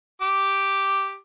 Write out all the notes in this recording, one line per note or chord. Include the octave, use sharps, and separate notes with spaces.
G4 D6